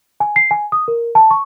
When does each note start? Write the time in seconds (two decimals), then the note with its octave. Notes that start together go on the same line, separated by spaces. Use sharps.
0.20 G#5
0.36 C7
0.51 G#5
0.72 D#6
0.88 A#4
1.15 A5
1.31 C#6